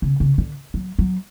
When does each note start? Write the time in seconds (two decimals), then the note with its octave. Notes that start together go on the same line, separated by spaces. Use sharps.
0.02 C#3
0.20 C#3
0.38 D3
0.74 F#3
0.99 F#3